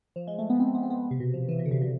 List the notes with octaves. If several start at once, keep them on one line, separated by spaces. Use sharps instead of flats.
F3
G#3
A3
B3
C4
B3
C4
B3
C3
B2
F3
E3
B2
D3
C3
B2